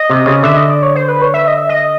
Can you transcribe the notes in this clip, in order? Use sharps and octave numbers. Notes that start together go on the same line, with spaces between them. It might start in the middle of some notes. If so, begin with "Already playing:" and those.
Already playing: D#5
C3
C#3
D3 E5
D#5
D5
C#5
C5
B4
C#5
E5
D#5
E5
D#5